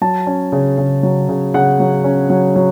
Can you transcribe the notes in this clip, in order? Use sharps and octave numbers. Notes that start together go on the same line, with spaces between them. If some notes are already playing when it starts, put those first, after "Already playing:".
F#3 A5
C#4
C#3
C#3
F#3
C#3
C#3 F#5
F#3
C#4
F#3
F#3